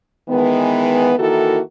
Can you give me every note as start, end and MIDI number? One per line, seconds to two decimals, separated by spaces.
0.29 1.13 51
0.29 1.13 52
0.29 1.13 56
0.29 1.13 59
1.18 1.59 51
1.18 1.59 52
1.18 1.59 58
1.18 1.59 64
1.18 1.59 66
1.18 1.59 69